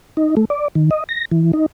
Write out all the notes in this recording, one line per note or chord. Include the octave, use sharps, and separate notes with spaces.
D#4
A3
D5
D#3
D#5
A#6
E3
D#4